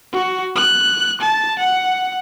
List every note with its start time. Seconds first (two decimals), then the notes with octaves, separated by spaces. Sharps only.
0.12 F#4
0.56 F#6
1.21 A5
1.59 F#5